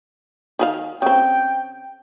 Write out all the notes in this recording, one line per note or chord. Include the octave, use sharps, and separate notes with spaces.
D#3 G#4 F5
C#3 C4 G5